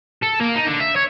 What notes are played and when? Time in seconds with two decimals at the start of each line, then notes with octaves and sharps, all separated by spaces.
0.22 A4
0.40 A#3
0.55 D#4
0.67 D3
0.80 E5
0.96 C#5